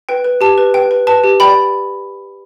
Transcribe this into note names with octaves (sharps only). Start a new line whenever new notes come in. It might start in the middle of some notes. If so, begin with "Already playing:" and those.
B4 G5
B4
G4 A5
B4
B4 G5
B4
B4 A5
G4
D5 G5 B5